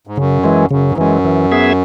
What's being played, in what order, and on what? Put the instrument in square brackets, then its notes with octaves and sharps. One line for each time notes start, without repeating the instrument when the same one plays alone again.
[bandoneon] G#2
[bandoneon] F#2 [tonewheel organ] C#3
[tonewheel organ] E3 G#3
[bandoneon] F#2 [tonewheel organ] C#3
[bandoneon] G#2
[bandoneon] F#2 [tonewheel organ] E3 G#3
[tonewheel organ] E3
B3 G#4 E5